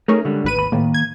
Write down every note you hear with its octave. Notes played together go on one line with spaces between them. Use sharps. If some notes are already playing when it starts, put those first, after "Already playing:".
A3 C#4 D#4 G#4 A#4
D3 G3 G#3
G#1 B4 D#7
D#2 B5
A2 D#3 A#3
G#6